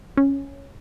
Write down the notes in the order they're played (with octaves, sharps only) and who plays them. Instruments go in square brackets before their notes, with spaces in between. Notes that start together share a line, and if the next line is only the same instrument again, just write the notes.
[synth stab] C#4